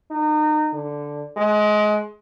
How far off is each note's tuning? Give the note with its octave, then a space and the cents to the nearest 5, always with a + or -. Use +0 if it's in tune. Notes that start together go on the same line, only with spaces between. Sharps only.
D#4 -30
D3 -5
G#3 +25